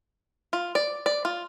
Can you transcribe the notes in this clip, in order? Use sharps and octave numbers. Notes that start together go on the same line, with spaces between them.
F4
D5
D5
F4